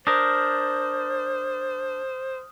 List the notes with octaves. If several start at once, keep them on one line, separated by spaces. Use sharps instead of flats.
D4 A#4 C5 D#6 F6 G6